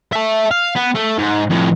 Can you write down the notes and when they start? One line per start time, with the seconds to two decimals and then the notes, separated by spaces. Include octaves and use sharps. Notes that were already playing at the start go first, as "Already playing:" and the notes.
0.13 E5 A5
0.51 F5
0.76 B3
0.95 A3
1.19 G#2
1.50 F2 A2